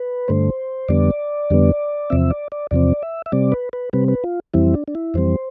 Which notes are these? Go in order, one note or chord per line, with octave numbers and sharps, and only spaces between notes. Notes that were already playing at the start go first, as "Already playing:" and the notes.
Already playing: B4
G2 D3 A3 C5
F2 D3 G3 B3 D5
F2 D3 G3 B3
E2 C3 F3 C4 E5
D5
D5
E2 C3 F3 C4 D5
E5
E5
C3 G3 C4 D5
B4
B4
C3 G3 C4 B4
B4
F4
F2 E3 G3 C4 E4
D4
D4
E4
F2 E3 G3 C4 C5